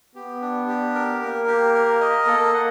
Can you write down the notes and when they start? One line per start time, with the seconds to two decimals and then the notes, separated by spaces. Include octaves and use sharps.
0.15 B3 G4
0.42 D4
0.68 G4
0.95 A#4
1.21 A#3 A#4
1.48 G4
1.74 A#4
2.01 D#5
2.27 A#3 A4
2.54 F#5